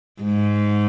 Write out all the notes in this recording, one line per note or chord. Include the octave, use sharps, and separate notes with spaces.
G#2